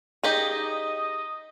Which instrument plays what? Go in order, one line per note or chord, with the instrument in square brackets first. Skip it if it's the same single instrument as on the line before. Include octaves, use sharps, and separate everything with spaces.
[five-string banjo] D#4 G4 G#4 [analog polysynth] D#5